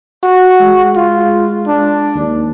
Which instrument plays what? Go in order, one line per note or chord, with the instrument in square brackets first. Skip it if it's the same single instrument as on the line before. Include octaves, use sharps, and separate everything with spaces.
[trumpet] F#4
[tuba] G#3
[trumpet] F4
D4
[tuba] D#2